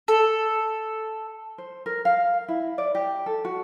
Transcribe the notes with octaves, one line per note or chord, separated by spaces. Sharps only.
A4
C5
A#4
F5
E4
D5
G4
A4
F#4